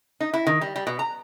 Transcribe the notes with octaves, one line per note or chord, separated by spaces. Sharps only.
D#4
E4
D#3
G3
G3
B2
A#5